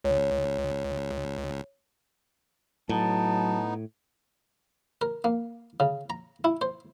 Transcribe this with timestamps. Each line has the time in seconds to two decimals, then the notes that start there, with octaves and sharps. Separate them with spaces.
0.04 C#2 C#5
2.89 A2 F#3 B3 D#4 A5
5.02 A#4
5.24 A#3
5.80 C#3
6.10 A#5
6.44 E4
6.61 C5